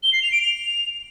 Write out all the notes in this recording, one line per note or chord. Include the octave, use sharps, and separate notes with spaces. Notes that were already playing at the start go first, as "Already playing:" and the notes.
G7
C7
F7
D7
F7